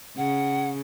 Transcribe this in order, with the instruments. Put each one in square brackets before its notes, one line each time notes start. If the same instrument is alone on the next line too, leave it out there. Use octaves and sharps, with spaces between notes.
[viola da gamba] C#3 [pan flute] F#5